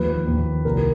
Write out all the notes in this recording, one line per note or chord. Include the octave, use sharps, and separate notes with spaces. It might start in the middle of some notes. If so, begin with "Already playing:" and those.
Already playing: D#2 F3 B4
D#2
C2 A#4